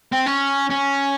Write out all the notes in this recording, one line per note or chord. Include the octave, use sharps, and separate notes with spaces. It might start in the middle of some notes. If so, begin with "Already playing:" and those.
C4
C#4
C#4